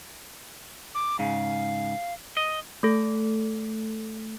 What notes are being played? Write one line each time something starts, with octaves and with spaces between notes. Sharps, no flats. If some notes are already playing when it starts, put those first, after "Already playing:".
D6
G#2 C#3 F5
D#5
A3 A4